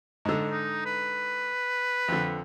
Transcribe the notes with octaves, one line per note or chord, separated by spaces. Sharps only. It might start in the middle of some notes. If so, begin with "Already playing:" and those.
G#2 D3
D#4
B4
F2 D3